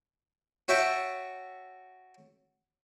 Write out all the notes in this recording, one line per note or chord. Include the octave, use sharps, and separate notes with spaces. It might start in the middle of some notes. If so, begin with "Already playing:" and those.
F#4 C#5 E5 G5 A5